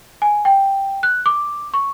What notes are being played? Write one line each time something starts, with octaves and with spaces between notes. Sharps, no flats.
G#5
G5
F#6
D6
C#6